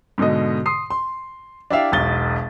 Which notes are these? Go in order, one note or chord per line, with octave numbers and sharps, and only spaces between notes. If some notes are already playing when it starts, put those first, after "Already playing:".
G#2 B2 D3 D#5
C6 D#6 C7
C6
D4 E4 G4 D5 E5 F5
E1 B1 A6 G7